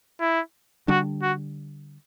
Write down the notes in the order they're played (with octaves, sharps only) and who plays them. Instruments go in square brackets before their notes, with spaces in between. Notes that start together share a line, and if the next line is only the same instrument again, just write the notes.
[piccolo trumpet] E4
[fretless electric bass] D3 G3 D4 [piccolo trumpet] F#4
[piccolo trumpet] F#4